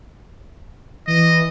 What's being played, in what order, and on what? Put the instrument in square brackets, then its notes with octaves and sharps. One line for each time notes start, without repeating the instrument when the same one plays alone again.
[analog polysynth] E3 [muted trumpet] D#5